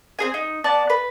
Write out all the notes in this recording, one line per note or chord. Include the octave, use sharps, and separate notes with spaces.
C4 G#4 G#5
D#4
B3 D5 A5 F#6
B4